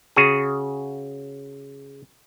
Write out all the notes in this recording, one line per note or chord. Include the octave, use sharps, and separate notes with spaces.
C#3 F#4 G#4